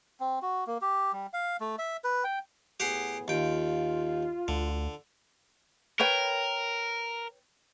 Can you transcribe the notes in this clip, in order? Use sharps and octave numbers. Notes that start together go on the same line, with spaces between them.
C4
F#4
A#3
G4
G3
F5
A3
E5
B4
G5
A2 B3 G4 G#4 F#5 C6
D#2 F4 G5
D2 D3
A#4 B4 C#5 G5